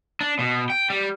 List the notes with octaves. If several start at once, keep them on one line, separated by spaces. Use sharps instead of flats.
D4
B2
G5
G3